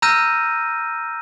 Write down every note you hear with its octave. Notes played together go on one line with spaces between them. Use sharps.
A#5 E6 F6 G6 A#6 D#7